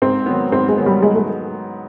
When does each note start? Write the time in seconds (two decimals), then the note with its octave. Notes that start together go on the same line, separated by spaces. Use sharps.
0.02 G#2 C4
0.26 D#3 F#3 B3
0.52 G#2 C4
0.68 G#3
0.77 D#3 F#3 B3
0.86 G3
1.02 G#2 G#3
1.15 A3